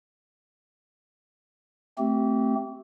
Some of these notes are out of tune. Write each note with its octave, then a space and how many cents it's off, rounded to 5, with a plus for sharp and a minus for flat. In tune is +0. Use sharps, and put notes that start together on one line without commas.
A3 +0 C4 -5 G4 -30